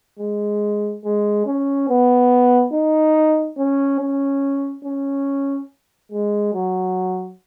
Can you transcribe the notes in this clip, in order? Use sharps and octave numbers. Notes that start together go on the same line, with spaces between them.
G#3
G#3
C#4
B3
D#4
C#4
C#4
C#4
G#3
F#3